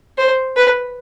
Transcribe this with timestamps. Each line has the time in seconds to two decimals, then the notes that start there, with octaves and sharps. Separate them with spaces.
0.18 C5
0.56 B4